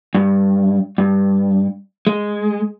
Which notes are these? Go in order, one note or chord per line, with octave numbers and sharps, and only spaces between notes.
G2
G2
G#3